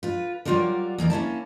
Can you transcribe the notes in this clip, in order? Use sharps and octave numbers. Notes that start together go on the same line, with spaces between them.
F4 B4
F#3 G3 F4 F#4 A#4 D5
E2 A#3 A#4 D5
A#3 C#4 E4 A5